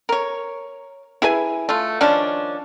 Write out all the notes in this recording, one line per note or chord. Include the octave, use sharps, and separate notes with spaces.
A#4 C#5
E4 G#4 B4 G#5
A3 F4
D#3 F3 C#4 D4